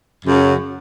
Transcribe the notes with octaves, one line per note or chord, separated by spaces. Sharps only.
F#2 C#3 F#3